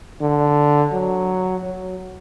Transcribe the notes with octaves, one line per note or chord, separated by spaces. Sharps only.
D3
F#3
F#3